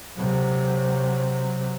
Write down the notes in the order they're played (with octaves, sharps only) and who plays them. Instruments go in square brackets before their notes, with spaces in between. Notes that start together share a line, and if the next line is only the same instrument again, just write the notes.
[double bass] C3 F#3